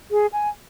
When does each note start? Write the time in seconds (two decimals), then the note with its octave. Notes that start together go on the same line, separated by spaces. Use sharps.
0.11 G#4
0.33 G#5